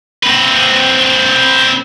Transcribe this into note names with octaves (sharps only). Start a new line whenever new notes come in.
C4 B4